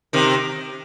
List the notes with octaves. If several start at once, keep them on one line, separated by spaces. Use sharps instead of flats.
C3 D#3